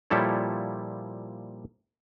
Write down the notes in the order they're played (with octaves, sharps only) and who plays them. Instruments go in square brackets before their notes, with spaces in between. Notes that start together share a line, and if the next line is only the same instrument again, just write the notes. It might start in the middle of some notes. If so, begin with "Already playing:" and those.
[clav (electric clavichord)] A#2 F3 G3 E4 A4 C#5